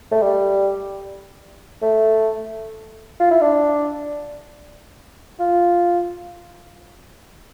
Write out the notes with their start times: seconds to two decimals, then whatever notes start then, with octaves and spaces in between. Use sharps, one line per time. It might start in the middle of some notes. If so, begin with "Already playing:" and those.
0.11 A3
0.22 G3
1.82 A3
3.20 F4
3.31 E4
3.41 D4
5.40 F4